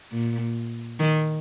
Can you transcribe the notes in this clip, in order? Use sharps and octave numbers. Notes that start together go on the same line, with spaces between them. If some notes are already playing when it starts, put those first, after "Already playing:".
A#2
D#3